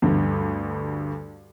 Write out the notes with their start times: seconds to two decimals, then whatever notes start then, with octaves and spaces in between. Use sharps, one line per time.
0.02 D2 G2